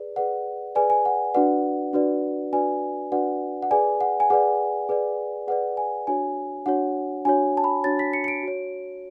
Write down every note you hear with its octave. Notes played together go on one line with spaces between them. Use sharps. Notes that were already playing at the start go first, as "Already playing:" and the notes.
Already playing: G#4 B4 D5
G#4 B4 D5 F#5
G#4 B4 D5 G#5
G#5
F#5
D4 F#4 B4 D5 F#5
D4 F#4 B4 D5
D4 F#4 B4 D5 G#5
D4 F#4 B4 D5 F#5
F#5
G#4 B4 D5 G#5
F#5
G#5
G#4 B4 D5 F#5
G#4 B4 D5
G#4 B4 D5 F#5
G#5
D4 F#4 C#5 G#5
D4 F#4 C#5 F#5
D4 F#4 C#5 G#5
A5
B5
D4 F#4 C#5 A6
B6
C#7
C#7
D7
F#4 C#5